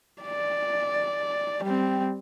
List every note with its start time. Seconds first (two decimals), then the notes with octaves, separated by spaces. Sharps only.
0.22 D5
1.64 G3 C4